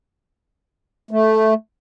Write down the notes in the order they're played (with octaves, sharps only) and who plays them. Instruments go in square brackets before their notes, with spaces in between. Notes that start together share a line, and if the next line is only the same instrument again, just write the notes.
[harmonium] A3